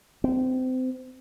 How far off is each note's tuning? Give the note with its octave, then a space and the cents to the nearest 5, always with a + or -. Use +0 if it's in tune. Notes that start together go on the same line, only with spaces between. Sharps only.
C4 -25